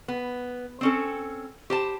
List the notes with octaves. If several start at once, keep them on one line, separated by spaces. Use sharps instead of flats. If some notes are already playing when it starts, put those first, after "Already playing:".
B3
C4 C#4 A4
G4 C5 A5